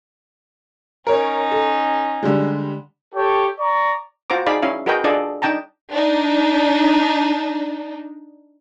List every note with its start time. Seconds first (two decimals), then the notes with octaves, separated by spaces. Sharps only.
1.07 C#4 D#4 A#4 C#5
1.51 A4
2.23 D3 G3 G#3
3.13 G4 A4 C#5
3.59 D5 A#5 C#6
4.30 F4 F#4 C5 A#5 D6
4.46 D#4 G#4 D5 F5 B5
4.62 C#4 E4 F5
4.86 F#4 G#4 A#4 B4 D#5 G5
5.04 D4 F4 G#4 A4 D5 D#5
5.42 D4 D#4 G5 A5 A#5
5.92 D4 D#4